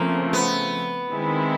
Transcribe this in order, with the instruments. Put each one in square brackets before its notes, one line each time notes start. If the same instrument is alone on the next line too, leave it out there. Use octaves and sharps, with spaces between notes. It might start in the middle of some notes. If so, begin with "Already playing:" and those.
Already playing: [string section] C#3 F3 A3 C4 [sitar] A#3
[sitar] B3
[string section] D#3 G#3 C4 E4